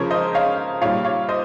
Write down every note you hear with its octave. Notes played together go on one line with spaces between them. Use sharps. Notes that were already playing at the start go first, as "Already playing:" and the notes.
Already playing: C#3 F3 G#3 A#4 C#5
C5 D#5
C#5 F5
A#2 G3 C#5 F5
C#5 F5
C5 D#5